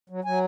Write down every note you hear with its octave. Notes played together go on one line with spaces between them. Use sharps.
F#3
F#3 G#5